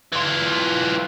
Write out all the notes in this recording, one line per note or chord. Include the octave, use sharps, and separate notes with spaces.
E3 F4